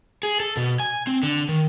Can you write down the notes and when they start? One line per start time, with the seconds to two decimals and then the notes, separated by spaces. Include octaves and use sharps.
0.23 G#4
0.40 A4
0.57 B2
0.80 G#5
1.07 C4
1.23 D3
1.49 D#3